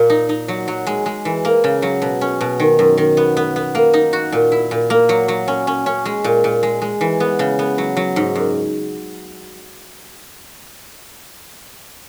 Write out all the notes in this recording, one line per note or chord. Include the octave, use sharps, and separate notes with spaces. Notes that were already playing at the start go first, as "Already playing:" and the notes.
Already playing: A#2 A#3
D#4
D#4
F#3
F#3
G#3
G#3
E3
A#3
C#3
F#3
B2
C#4
B2
D#3
F#2
D#3
B3
B3
B3
A#3
D#4
F#4
A#2
E4
A#2
A#3
F#3
F#3
C#4
C#4
C#4
G#3
A#2
A#2
G#3
G#3
E3
B3
C#3
B3
F#3
F#3
G#2
F#2